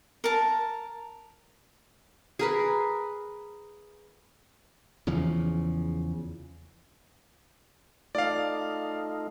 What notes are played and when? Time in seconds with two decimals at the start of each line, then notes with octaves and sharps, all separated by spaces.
0.24 A#4 A5
2.39 G#4 A#4 B4
5.07 E2 C#3 F3
8.15 A3 D#4 F4 D5 F5